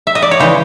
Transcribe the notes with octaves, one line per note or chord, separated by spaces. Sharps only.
E5
D#5
D5
C#5
C#3 E3 G#3 C5